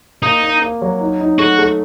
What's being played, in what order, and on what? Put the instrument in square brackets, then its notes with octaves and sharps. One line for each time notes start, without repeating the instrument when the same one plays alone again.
[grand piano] A#3 [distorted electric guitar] D#4
[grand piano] A#3
A#3
F#3
D#4
D#4
[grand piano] A3 [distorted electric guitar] F#4
[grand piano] A3